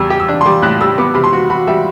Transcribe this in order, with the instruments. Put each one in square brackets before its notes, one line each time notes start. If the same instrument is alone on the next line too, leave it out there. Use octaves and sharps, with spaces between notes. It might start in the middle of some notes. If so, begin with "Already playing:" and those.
Already playing: [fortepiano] E2 G3 [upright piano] E6
[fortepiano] G4
[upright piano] E6
[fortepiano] D4
[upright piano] C6
[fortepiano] G3 [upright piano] D6
[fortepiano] A2 [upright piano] F#6
[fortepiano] G3 [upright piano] E6
[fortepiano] B3 [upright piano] D6
[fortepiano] C3 [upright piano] B5
[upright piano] C6
[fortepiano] F#4
[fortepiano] F#4 [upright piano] B5
[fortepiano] G3 [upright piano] E5